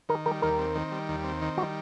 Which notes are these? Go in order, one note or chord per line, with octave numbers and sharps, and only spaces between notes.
D#3 A#4
G3 A#4
D#2 A#4
C4
D#3
G3
D#2
C4
D#3
G3 F#4